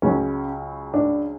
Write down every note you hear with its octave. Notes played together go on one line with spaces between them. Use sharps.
C#2 C#3 F#3 C#4
D4